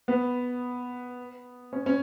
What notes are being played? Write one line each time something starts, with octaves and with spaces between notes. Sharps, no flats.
B3
C#4
C#4